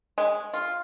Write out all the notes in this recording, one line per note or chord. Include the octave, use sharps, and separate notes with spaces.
G#3
F4